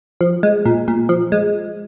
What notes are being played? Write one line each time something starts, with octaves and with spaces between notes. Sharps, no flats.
F3
G#3
A#2
A#2
F3
G#3